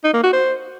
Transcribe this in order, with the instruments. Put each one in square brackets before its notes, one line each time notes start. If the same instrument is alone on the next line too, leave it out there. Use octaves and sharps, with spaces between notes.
[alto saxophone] D#4
A#3
F#4
C5